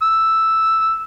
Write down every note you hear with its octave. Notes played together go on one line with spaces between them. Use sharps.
E6